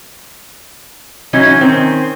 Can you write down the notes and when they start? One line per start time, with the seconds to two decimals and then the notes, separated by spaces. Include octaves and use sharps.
1.33 E3 F#3 C#4 D#4
1.60 D#3 C4 C#4